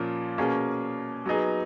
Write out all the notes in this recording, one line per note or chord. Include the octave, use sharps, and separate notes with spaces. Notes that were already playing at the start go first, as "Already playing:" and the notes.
Already playing: A#2 F3 A#3 C#4
B2 A#3 C#4 G#4
F#3 B3 D#4 G#4